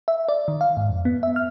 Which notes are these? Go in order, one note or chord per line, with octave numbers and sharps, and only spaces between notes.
E5
D5
D#3
F5
G#2
F2
B3
E5
F6